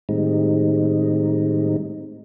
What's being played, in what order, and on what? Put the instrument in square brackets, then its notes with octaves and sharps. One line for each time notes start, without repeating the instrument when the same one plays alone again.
[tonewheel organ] A2 D#3 G3 G#3 C4 D#4